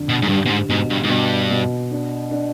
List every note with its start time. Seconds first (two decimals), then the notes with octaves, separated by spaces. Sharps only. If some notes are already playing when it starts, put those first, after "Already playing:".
Already playing: F2 D3
0.09 B2
0.22 G#2
0.29 G2 G4
0.46 B2
0.49 G#2
0.69 G#2 B2
0.90 G2
1.03 G#2
1.10 G2 B2
1.50 B2
1.91 D4
2.31 D4